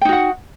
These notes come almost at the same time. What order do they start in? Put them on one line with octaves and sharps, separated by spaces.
G5 D#4 F#4 F#5